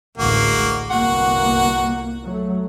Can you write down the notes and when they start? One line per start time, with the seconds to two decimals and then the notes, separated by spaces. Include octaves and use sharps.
0.17 A1 D2 G#3 A#3 F#4
0.90 G1 C2 A#3 F#4 F#5
2.24 F#3 A3